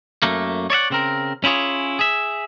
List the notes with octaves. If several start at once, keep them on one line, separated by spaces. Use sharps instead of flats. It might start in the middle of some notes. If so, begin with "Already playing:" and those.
F#2 A3 A#3
C#5 D5 E5 F#5
C#3 C4 A#4
C#4 E4 F4 G#4 C#5
G#4 E5